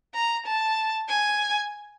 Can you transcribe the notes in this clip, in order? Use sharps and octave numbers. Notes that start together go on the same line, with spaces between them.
A#5
A5
G#5